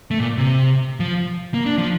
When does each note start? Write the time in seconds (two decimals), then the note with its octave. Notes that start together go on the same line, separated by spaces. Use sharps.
0.11 A3
0.20 A#2
0.38 C3
1.00 F3
1.54 A#3
1.66 D4
1.78 F3